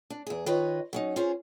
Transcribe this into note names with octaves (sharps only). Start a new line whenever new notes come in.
D4
E2 G#4
D#3 F4 B4 C#5 D#5
F#3 C#4 D#4
C#4 F4 G#4 C5